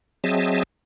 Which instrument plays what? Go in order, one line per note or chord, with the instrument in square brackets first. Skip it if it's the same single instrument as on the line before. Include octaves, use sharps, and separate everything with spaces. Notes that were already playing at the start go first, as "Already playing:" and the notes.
[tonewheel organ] F#3 C4 G#4 D#5 E5 A5